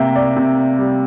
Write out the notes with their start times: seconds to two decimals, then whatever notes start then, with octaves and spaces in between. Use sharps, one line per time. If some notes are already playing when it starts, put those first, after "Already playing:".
Already playing: C3 A#3 E5 G5 A#5
0.16 D5
0.36 C3
0.79 G3